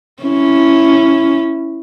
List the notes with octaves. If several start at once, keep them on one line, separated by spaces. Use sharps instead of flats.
C#4 E4